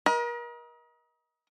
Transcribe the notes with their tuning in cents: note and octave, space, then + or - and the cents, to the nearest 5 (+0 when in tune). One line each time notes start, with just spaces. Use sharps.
A#4 +40 D#5 +25